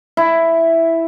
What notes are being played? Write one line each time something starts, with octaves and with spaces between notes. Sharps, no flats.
E4